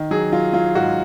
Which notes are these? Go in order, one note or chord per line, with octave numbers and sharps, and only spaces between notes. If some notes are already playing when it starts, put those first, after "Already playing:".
Already playing: D#3
F#3 G#4
F#3 F4
F#3 F4
G#2 F#4